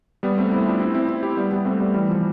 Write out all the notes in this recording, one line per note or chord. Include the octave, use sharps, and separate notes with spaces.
G3 B3
A3 C4
C4 E4
D4 F4
C4 E4
C4 E4
C4 E4
E4 G4
G3 B3
G3 B3
A3 C4
G3 B3
E3 G3
F3